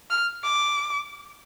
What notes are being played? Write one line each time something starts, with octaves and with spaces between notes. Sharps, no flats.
F6
D6